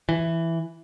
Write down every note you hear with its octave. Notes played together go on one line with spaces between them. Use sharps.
E3